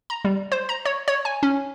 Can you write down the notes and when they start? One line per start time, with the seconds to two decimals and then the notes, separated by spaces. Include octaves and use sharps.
0.10 A#5
0.25 G3
0.52 C5
0.69 A#5
0.86 C#5
1.08 C#5
1.25 G#5
1.43 C#4